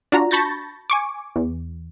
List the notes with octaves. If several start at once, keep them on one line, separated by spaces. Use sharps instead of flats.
D4 F4 F#4 A#5
A5 B5 C#6 G6 A6 A#6
G#5 C#6 D6
E2